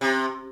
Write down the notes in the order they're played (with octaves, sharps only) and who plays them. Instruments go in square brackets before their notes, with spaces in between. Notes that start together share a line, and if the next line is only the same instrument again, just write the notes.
[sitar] C3